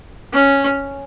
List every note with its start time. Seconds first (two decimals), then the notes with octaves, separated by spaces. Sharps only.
0.33 C#4